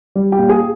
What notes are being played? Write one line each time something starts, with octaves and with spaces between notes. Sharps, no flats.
G3
G4 G5
A#2
G#4 G#5